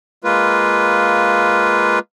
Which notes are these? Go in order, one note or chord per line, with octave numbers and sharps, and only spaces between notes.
G#3 A#3 F4 B4